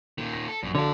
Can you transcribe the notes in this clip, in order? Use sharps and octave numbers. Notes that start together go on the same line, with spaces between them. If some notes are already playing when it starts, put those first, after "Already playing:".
A#2 D#3 A#3
A#6
A4
A#1 F#2
D3 F#4 A4 C#5 F5 A5